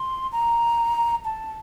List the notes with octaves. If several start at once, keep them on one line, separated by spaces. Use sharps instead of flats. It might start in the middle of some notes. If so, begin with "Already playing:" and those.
Already playing: C6
A#5
A5